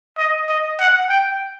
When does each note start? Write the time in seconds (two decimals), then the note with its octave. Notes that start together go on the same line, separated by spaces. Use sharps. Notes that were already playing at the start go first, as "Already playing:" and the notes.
0.18 D#5
0.49 D#5
0.80 F#5
1.09 G5